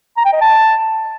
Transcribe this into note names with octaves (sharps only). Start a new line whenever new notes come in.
A#5
G5
D#5
A5